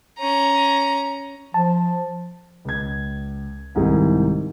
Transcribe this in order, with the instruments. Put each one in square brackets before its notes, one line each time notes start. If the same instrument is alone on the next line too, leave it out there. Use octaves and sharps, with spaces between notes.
[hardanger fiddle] C#4 A#5
[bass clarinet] F3 [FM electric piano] A5
[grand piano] C#2 G#6
C2 G#2 C3 D#3 E4